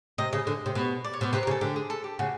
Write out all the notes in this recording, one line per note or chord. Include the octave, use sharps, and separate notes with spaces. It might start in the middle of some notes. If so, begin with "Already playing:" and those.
C3 D#5
C#3 D#5
D3
C3
B2
D5
C#5
B2 C5
C3 B4
A#4
C#3
A4
D3 G4
G#4
A4
G4
C#3 F#4